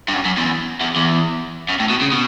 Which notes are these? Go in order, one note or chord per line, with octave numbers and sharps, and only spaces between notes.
G2
F#2
F#2
E2
E2
E2
F#2
A2
B2
C#3
B2